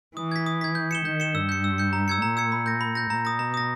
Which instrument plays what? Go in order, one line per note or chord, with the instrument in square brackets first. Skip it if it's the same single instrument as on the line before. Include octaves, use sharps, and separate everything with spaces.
[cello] E3 [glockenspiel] D#6
[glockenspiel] G#6 B6
D#6
G#6 B6
G6
C#7 E7 G7
[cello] D#3 [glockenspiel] G6
[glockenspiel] C#7 E7 G7
[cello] G2 [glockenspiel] E6
[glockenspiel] G6 C#7
E6
G6 C#7
A#5
E6 G#6 C#7
[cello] A#2 [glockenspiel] A#5
[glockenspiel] E6 G#6 C#7
B5
G6 A#6
B5
G6 A#6
[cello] A#2 [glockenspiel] A#5
[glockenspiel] D#6 A#6
[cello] B2 [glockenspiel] A#5
[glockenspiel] D#6 A#6